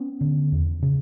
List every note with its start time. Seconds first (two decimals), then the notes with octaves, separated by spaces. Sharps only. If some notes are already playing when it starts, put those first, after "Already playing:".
Already playing: B3 C#4
0.21 D3
0.52 E2
0.82 C#3